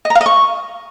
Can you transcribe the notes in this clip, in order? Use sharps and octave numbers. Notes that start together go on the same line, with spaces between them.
D#5
A#5
F5
D#5
C#6